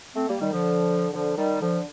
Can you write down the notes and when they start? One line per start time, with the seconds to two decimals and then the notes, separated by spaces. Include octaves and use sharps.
0.16 A3 C4
0.28 G3 A#3
0.41 D#3 G3
0.53 D3 F3
1.13 D3 F3
1.38 D#3 G3
1.62 D3 F3